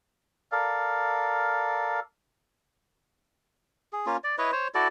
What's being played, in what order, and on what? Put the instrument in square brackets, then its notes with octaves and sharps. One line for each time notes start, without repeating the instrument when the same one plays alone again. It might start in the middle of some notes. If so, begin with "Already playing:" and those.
[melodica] A4 A#4 D5 F5
G#4
A#3 C#4 F4
D5
E4 B4 C#5 D#5
C5 C#5
E4 F#4 A4 D5